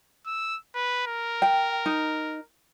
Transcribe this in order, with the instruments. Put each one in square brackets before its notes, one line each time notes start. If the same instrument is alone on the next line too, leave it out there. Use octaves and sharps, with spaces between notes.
[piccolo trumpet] E6
B4
A#4
[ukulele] G5
D#4